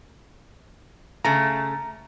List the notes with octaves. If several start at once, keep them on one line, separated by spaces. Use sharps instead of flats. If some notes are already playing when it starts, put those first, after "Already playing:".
C#3 A3 A#5